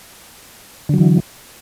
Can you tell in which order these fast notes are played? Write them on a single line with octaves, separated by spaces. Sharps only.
D3 F#3 E3